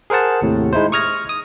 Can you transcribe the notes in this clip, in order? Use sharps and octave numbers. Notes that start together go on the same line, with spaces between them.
G#4 A#4 C5 F#5 A5
D#2 A2 C3
G#3 D#4 E4 C5
C#6 D#6 F6 G#6 A#6
D#6